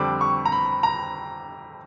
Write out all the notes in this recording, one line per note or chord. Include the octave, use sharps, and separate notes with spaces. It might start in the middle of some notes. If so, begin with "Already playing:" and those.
Already playing: F2 D3 G3 C4 D6
C#6
A#5
B5
A#5